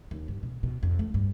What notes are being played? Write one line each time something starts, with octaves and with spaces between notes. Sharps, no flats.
D#2
G2
B2
B2
F2
A3
G2